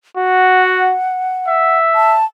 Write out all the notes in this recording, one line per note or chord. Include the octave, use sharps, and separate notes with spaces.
F#4 F#5
E5
A5